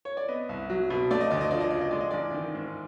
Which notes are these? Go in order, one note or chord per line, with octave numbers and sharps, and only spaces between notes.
C#5
D5
B3 D#5
C2
F#3
B2
A3 D5
D#5
D2 D5
D#5
F3 D5
D#5
C#3 D5
D#5
G#3 D5
D#5
A1 D5
D#3
G#2